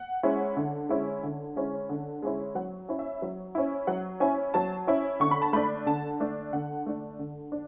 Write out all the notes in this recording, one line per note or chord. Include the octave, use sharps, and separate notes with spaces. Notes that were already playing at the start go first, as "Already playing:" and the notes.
Already playing: F#5
G#3 C#4 E4
D3
G#3 C#4 E4
D3
G#3 C#4 E4
D3
G#3 C#4 E4
F#3 F#5
C#4 E4
E5
F#3
C#4 E4
F#3 F#5
C#4 E4 G#5
F#3 A5
C#4 E4
D3 C#6
B5
A5
A3 D4 B5
D3 A5
A3 D4
D3 F#5
A3 D4
D3
D4